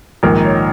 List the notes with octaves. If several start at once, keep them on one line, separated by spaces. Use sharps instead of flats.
A#1 G#2 D#3 A#4
C#5